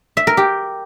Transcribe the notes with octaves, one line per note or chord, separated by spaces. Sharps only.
E5
A#4
G4